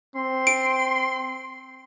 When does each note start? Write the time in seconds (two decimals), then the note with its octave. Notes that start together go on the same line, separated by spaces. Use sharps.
0.16 C4 C6
0.47 D7